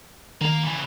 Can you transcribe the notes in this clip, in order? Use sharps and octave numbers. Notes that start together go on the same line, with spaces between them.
D#3 A#3 A#5
C#3 E3